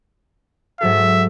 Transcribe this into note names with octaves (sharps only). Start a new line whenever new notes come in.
G#2 F#3 A4 E5